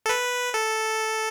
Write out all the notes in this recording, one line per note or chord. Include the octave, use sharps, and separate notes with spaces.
A4
B4
A4